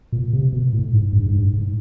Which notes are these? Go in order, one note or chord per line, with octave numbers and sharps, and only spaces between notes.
A#2
C3
B2
A2
G#2
G2
G#2
G2
G#2